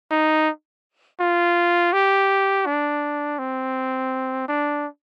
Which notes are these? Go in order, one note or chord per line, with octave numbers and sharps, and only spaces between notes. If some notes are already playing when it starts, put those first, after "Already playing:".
D#4
F4
G4
D4
C4
D4